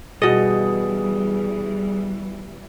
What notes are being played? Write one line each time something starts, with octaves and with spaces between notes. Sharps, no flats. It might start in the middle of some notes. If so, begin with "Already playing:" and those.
B2 E3 G3 G#4 D#5